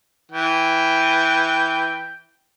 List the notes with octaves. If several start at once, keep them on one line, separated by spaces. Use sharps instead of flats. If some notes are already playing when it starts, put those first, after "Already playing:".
E3 G5